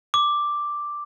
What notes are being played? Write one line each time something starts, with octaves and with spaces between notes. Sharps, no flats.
D6